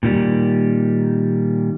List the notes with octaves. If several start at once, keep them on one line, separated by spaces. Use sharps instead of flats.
A#2 D#3 G3